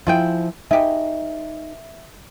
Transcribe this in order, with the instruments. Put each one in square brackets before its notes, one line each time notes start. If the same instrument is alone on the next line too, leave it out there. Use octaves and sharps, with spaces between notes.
[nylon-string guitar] F3 E4 [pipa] F4 G#4 G5
[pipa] B2 G4 G#4 [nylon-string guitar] D#4 [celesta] E5